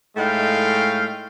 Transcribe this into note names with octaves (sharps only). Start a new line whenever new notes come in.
A2 G#3 A3 D#4 F5 G5